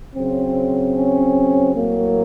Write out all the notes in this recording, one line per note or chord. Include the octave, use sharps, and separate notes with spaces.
C#3 F#3 C4
C#4
A2 F#3 A#3